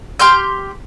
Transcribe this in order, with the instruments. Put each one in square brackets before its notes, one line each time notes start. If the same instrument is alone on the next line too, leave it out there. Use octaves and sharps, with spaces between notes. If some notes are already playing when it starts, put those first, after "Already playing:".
[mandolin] G4 C6 F6 G6